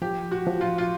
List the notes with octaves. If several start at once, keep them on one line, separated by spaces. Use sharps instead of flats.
F3 G4
F#4
F3
F4
F4